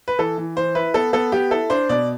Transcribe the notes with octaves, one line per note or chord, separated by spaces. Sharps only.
B4
E3 A4
E3
E3 C5
E4 B4
B3 A4
B3 A4
B3 G4
E4 A4
D4 C5
B2 D5